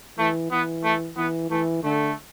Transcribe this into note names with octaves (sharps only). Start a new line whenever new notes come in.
E3 A3
E3 B3
A3
E3 B3
E3 A3
D3 A3